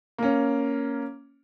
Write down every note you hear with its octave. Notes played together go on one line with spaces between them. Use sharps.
A#3 C#4